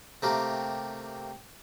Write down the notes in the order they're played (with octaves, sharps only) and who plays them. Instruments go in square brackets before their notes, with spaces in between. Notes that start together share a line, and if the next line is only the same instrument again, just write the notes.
[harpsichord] C3 A3 A#3 G4 A#4